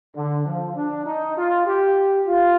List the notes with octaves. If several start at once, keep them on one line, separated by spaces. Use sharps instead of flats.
D3
F3
D4
D#4
F4
G4
F4